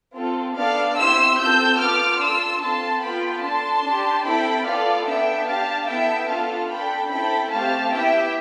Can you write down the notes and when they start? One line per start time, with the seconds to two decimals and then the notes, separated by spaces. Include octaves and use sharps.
0.16 C4 F4 A4
0.57 B3 D4 A4 D5 F5
0.98 C4 E4 G4 C6 E6
1.38 C4 F4 A4 E6 G6
1.79 B3 F4 A4 D6 F6
2.20 D4 F4 A4 C6 E6
2.61 C4 F4 A4 A5 C6
3.02 B3 F4 A4 G5 B5
3.43 D4 A4 A5 C6
3.85 D4 G4
4.25 C4 E4 A4 G5 B5
4.66 B3 F4 A4 D5 F5
5.06 B3 D4 A4 E5 G5
5.48 D4 G4 F5 A5
5.88 B3 E4 A4 E5 G5
6.29 B3 D4 F4 A4 F5 A5
6.70 D4 A4 G5 B5
7.11 C4 E4 A4 G5 B5
7.52 A3 C4 G4 F5 A5
7.93 B3 E4 G4 E5 G5